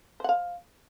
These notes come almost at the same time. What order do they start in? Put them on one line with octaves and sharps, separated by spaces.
C5 F#5 F5